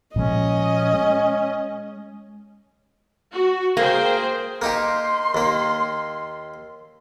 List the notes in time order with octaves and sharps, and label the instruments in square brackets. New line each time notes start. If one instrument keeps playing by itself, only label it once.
[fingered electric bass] A#2 F3 G#3 [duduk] C#4 [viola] D#5
[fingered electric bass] G#3
[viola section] F#4
[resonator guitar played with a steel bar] A#3 [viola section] G#4 C5 G5
[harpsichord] A#3 D#4 G4 [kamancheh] C6
[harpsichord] D#2 A#3